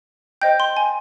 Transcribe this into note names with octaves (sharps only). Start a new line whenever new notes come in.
C5 D#5 G5 G6
C6
G#5